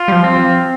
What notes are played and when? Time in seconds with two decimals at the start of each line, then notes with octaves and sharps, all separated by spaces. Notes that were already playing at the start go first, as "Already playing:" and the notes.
Already playing: F4
0.08 G3
0.12 F3
0.24 C4